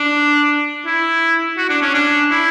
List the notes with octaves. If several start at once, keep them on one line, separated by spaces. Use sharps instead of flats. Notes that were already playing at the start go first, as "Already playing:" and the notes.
Already playing: D4
E4
F#4
D4
C#4
D4
E4